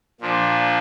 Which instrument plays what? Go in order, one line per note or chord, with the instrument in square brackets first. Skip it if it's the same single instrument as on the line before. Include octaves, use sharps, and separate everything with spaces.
[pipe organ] A#2 F3 D4